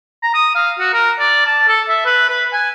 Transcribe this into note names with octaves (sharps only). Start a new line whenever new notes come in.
A#5
D#6
F5
F#4
A#4
D5
A5
A4
E5
B4
B4
G#5